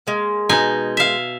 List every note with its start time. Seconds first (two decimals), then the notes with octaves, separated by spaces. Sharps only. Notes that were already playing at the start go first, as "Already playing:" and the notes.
0.07 G#3 A#3
0.49 B2 D#4 G#5
0.97 E5 F5